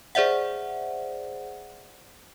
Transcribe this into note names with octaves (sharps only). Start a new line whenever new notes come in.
G#4 C5 D5 E5 F#5